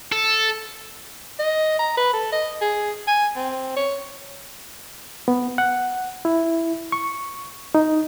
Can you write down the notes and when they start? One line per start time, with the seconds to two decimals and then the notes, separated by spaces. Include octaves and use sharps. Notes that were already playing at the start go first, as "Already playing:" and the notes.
0.12 A4
1.39 D#5
1.79 A#5
1.97 B4
2.13 A4
2.32 D#5
2.61 G#4
3.07 G#5
3.36 C4
3.76 C#5
5.28 B3
5.58 F#5
6.25 E4
6.92 C#6
7.75 D#4